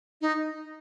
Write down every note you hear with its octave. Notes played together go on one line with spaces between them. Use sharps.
D#4